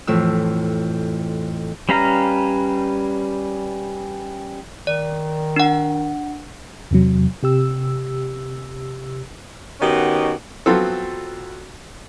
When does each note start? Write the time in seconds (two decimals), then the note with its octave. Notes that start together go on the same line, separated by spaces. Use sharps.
0.07 F2 A2 E3 E6
1.89 G3 C#4 B4 F5 A#5
4.87 D#3 D5
5.56 D4 F#5
6.91 E2 C3 F#3
7.43 C3 G4 E6
9.81 D#3 B3 C#4 D#4 F#4 G4
10.66 F3 F#3 B3 C4 F4 A4